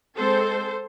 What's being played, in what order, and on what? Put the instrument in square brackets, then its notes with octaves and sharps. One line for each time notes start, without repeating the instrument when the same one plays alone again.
[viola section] G#3 C4 A4 C5